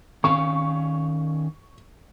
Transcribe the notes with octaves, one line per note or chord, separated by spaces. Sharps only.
D#3 C#4 F5 C#6